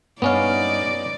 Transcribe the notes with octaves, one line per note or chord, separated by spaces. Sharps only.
G2 B3 C#4 D#4 D5 D#5 F5